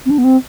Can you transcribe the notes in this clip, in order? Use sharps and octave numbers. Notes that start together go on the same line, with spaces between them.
C4
D4
B3
C4